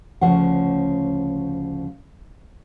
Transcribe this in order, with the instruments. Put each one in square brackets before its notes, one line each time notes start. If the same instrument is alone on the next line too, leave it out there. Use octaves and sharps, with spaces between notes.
[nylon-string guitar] D2 C#3 F3 C#4 F#5